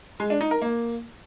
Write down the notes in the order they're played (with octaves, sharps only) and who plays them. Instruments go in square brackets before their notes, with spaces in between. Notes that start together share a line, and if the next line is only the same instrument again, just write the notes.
[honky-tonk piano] G#3
D4
D#4
A#4
A#3